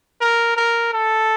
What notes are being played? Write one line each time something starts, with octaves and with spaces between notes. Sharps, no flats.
A#4
A#4
A4